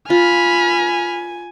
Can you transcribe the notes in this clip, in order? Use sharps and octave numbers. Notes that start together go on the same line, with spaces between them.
F4 G#5 B5 F6